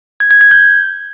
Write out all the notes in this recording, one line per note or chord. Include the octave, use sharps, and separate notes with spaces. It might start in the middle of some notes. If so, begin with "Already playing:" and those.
G#6
G#6
G#6
G6